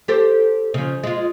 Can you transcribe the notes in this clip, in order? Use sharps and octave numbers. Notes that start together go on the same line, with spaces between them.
G4 A4 C5
C#3 F3
G#3 F4